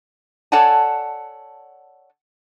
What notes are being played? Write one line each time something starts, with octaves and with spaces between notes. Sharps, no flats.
A4 C#5 D5 F#5 G#5 A5